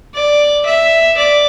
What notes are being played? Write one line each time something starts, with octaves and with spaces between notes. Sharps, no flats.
D5
E5
D5